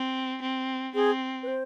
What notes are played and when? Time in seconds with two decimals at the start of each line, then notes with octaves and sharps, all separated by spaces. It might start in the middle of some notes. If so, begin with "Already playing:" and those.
Already playing: C4
0.42 C4
0.95 C4 G#4
1.43 B4
1.47 C5